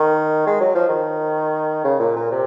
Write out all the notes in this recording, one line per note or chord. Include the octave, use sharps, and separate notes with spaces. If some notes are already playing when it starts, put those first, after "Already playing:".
Already playing: D#3
G#3
F#3
F3
D#3
C#3
A#2
A#2
C3